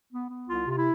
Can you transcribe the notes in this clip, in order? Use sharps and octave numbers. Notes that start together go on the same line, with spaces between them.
B3
B3
C2 F4
C3 F4
E4